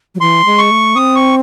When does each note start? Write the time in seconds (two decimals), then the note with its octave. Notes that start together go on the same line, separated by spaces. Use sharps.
0.15 F#3
0.20 E3 C6
0.45 G#3
0.58 C#6
0.71 A3
0.95 C4 D#6
1.16 C#6